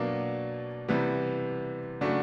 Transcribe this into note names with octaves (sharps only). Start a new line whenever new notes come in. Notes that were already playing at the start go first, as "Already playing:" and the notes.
Already playing: B2 F#3 A#3 D4
C3 E3 G3 B3
C#3 F#3 A3 D4 F#4